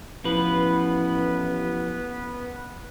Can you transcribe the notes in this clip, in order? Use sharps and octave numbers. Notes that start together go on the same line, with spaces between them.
A1 F3 B3 B4